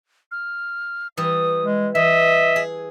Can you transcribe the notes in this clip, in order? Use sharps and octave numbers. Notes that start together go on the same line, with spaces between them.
F6
E3 G3 D#6
G#3
E3 D#5 E5
G#4